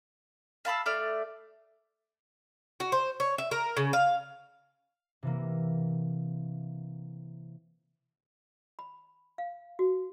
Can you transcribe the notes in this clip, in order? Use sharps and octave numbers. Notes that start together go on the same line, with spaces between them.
F5 A5 B5 E6
A3 D5 F6
F#4
C5
C#5
E5
A#4
C#3
F5
C3 E3 A#3
B5
F5
F#4